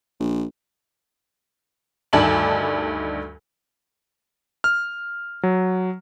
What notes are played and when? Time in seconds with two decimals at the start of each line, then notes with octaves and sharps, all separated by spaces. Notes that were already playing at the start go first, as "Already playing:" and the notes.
0.20 A#1
2.13 D2 G2 D#3 D5 A5 F#7
4.64 F6
5.43 F#3